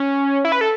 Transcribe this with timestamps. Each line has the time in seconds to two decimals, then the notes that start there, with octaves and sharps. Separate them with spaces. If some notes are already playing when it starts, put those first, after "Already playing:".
Already playing: C#4
0.45 E4
0.52 B4
0.61 A4